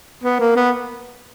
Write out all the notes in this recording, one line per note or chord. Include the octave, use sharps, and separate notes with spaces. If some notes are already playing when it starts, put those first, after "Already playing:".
B3
A#3
B3